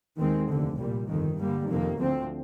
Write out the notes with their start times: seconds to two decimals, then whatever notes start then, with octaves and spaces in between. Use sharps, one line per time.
0.18 D#2 D#3 G#3 C4
0.48 F1 D#2 D3
0.78 C2 A#2 G3
1.08 G1 F2 D#3
1.38 G2 D3 G3 A#3
1.68 F2 C3 D#3 A#3
1.98 D2 D3 F3 C4